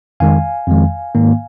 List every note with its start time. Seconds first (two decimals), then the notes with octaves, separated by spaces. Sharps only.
0.20 F2 D#3 G#3 F5 G#5
0.68 F2 D#3 G#3
1.15 G#2 D#3 A#3